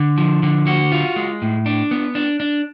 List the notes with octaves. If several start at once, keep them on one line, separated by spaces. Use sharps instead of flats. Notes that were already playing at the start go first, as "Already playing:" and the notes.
Already playing: D3
F3
D3
F#4
F4
G#3
A2
D4
B3
D4
D4